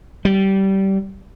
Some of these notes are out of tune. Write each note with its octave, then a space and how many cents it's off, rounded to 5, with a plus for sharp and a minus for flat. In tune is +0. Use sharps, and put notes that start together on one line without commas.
G3 -20